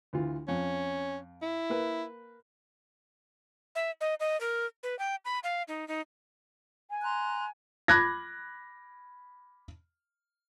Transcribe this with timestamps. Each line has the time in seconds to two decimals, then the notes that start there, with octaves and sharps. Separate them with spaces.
0.13 D2 E3 F4
0.48 F2 C#4
1.42 E4
1.70 A#3 B4
3.75 E5
4.01 D#5
4.20 D#5
4.40 A#4
4.83 B4
4.99 G5
5.25 B5
5.44 F5
5.68 D#4
5.88 D#4
6.90 G#5
7.03 A#5 C6 F#6
7.88 B5 D6 F#6 G#6 A#6